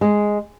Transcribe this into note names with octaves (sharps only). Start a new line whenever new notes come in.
G#3